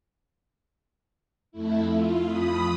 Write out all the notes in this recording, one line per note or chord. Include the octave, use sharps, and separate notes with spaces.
F2 A3 E4
F4
F2 B5 D#6